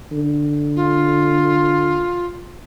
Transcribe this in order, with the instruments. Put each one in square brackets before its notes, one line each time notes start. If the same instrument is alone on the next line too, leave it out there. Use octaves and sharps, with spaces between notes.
[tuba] D3
[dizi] F4